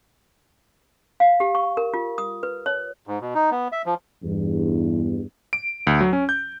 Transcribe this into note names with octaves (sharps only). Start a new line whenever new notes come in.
F5
G4
C#6
A#4
F4
D#6
B4
C#5
G#2
B2
D#4
B3
E5
F3
E2 G2
D7
D2
F#3
C#4
G6